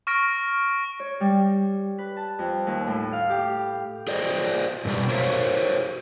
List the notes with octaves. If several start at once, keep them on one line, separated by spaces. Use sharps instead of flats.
C#6 F6 A#6 D7
C#5
G3
B4
A5
F2
D#2
A2
F5
G4
G#4 C5 D5 D#5
F#2 B2 G3 D5
F#4 A#4 C5 C#5 E5 F5